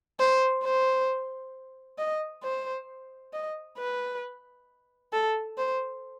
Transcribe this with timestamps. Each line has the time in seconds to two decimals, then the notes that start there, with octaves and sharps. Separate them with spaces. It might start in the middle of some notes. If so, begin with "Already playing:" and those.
0.19 C5
0.64 C5
1.98 D#5
2.43 C5
3.33 D#5
3.78 B4
5.13 A4
5.58 C5